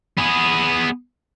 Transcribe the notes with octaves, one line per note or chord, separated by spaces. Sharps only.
B3 G#4